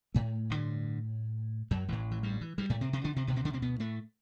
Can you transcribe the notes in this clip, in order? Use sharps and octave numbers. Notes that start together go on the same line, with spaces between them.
A2 A3
A1 G2 D3
F#2 F#3
A1 A2 E3
E3
G2 G3
E3
G2 G3
A2 A3
C3 C4
C3 C4
D3 D4
C3 C4
D2 B2 D3 B3
C3 C4
D3 D4
C3 C4
B2 B3
A2 A3